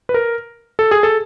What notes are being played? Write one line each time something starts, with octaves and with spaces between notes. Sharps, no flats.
B4
A#4
A4
G#4
A4